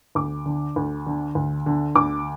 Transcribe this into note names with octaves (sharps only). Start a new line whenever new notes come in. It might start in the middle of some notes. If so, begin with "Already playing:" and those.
D2 D6
D3
D2
D3
D2
D3
D2 D6